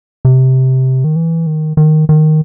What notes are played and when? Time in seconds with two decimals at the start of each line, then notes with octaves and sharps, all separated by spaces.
0.25 C3
1.04 D#3
1.16 E3
1.47 D#3
1.77 D#3
2.09 D#3